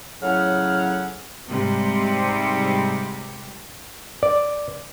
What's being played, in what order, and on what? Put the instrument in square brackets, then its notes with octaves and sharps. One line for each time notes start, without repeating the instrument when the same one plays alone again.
[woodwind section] A2 C#3 F#3 C#4 F#5 F6
[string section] G#2 C3 G3
[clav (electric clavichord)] D5